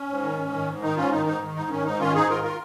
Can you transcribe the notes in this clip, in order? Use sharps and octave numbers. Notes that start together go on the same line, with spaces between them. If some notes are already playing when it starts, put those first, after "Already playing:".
Already playing: C#4
G#2
D#3
G#2
D#3
G#2
D#3 D#4
G#2 C#4 F4
D#3 D#4
G#2 D#4
D#3
G#2 D#4
D#3 C#4
G#2 D#4
D#3 C#4 F4
G#2 D#4 G#4
D#3 F4 A#4
F4 A#4